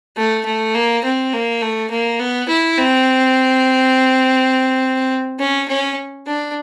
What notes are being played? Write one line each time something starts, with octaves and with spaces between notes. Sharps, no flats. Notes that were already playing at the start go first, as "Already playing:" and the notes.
A3
A3
A#3
C4
A#3
A3
A#3
B3
E4
C4
C#4
C#4
D4